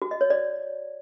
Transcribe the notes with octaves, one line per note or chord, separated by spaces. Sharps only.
F#4
D#5
C#5
D5